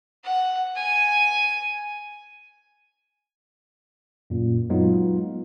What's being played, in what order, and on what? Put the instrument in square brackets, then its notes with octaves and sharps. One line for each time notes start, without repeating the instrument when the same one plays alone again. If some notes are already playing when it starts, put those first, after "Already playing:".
[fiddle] F#5
G#5
[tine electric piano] F#2 A#2
F#3 G#3 B3 D#4 F4